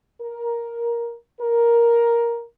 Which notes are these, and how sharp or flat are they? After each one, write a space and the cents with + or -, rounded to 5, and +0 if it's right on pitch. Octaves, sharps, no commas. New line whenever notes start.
A#4 +10
A#4 +5